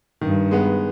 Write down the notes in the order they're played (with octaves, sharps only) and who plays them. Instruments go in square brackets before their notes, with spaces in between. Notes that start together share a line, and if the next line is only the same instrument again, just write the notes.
[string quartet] G2 [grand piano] D#3
[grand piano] G#3 B3